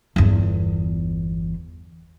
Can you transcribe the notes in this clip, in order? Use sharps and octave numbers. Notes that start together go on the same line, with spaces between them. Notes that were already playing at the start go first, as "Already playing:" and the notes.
G1 E2